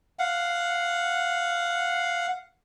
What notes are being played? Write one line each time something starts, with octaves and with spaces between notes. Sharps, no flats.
F5 F#5